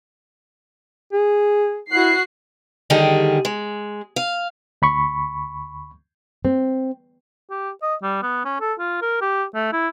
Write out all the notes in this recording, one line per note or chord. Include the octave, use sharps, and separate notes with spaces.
G#4
E4 F#4 F#6 C7
D3 D#3 G3 G4 G#4
G#3
F5
D2 B5 C#6
C4
G4
D#5
G3
B3
C#4
A4
F4
A#4
G4
A3
E4